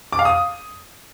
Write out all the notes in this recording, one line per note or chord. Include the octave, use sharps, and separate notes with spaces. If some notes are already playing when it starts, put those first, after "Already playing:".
D6
F5
D#6